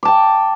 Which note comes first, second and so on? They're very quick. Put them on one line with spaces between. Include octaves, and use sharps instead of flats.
D6 A5 G5